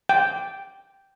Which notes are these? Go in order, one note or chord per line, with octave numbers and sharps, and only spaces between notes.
G5